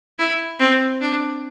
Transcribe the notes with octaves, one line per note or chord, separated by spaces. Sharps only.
E4
C4
D4